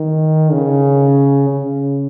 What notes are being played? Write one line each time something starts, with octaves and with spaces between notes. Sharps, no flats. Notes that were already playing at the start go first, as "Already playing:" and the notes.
Already playing: D#3
C#3
C#3